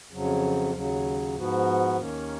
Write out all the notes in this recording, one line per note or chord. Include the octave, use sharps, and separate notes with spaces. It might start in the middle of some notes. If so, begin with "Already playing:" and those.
F2 C#3 F#3
D#2 C#3 F#3
G#2 F3 B3 F#4
D#2 D#3 A#3 C#4